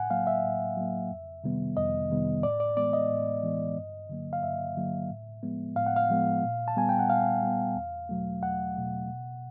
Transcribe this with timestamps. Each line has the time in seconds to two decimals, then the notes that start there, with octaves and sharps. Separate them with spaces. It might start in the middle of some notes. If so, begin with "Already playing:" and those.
Already playing: A2 F#5 G#5
0.10 F#3 A#3 F5
0.27 E5
0.44 A2
0.77 F#3 A#3
1.10 F2
1.44 C3 D#3 G3 B3
1.77 F2 D#5
2.10 C3 D#3 G3 B3
2.43 A2 D5
2.60 D5
2.77 E3 G#3 B3 D5
2.93 D#5
3.10 A2
3.43 E3 G#3 B3
3.77 G2
4.09 D3 F#3 A#3
4.33 F5
4.43 G2 E5
4.77 D3 F#3 A#3
5.10 A2
5.43 F3 G#3 B3
5.76 A2 F5
5.86 F#5
5.96 F5
6.10 F3 G#3 B3
6.43 A#2
6.68 A5
6.77 G3 B3 G#5
6.89 G5
6.99 F#5
7.09 A#2 F5
7.43 G3 B3
7.76 E2
8.09 B2 F#3 A3
8.43 E2 F#5
8.76 B2 F#3 A3
9.09 B2